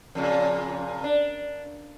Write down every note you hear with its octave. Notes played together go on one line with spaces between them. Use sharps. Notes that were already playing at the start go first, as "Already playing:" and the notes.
F2 A#2 C#3
D4